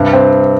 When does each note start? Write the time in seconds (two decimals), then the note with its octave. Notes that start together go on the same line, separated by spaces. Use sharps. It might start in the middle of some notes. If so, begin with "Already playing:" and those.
Already playing: G2 C3 F5
0.13 C4